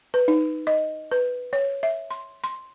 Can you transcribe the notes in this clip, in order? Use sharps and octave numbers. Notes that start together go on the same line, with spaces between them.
B4
D#4
D#5
B4
C#5
E5
C6
C6